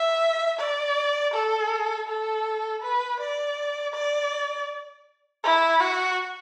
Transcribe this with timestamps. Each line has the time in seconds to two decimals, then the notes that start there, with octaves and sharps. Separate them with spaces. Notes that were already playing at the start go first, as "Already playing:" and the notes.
Already playing: E5
0.59 D5
1.33 A4
2.08 A4
2.82 B4
3.20 D5
3.93 D5
5.43 E4
5.80 F#4